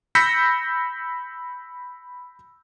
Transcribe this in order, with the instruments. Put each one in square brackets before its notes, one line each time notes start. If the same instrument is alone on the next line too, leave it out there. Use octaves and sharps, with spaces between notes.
[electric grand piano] B5 E6 G6 A#6 B6 C#7